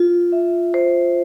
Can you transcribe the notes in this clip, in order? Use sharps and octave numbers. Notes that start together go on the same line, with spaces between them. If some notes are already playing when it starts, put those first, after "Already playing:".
Already playing: F4
E5
C5